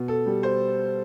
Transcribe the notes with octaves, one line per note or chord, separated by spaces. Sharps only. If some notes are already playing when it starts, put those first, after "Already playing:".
Already playing: B2
A4
G3
C5